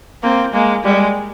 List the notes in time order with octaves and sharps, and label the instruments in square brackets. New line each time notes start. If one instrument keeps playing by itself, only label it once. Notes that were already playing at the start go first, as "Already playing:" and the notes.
[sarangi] A#3 [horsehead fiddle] C4
[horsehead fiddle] G#3 [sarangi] A#3
[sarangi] G3 [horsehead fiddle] G#3